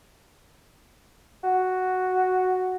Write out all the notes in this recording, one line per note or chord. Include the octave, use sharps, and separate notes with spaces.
F#4